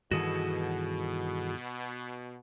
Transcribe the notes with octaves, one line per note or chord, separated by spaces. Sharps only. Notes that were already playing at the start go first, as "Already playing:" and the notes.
G2 B2 D#3 E3 F#4 G#4 A4